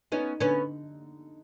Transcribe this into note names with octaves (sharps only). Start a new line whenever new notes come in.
B3 C#4 D#4
D3 B3 C#4